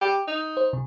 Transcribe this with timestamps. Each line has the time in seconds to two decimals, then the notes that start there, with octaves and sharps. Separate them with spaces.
0.01 G4
0.28 D#4
0.57 C5
0.73 C3